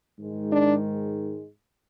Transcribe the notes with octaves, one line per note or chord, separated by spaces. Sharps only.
G#2 D#3 G#3
D4